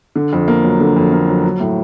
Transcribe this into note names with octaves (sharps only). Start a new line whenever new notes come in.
D3
F2
A#3
F#3
D3
F2
A#3
F#3
F#3
A2